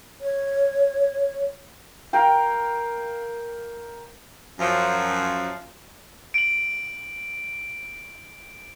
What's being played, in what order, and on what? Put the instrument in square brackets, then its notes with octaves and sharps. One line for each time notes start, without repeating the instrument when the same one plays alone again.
[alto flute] C#5
[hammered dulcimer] A#4 F5 G5
[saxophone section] F#2 F3
[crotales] D7 F#7